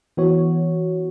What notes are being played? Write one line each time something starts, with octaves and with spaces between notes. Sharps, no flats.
E3 B3 F#4 C#5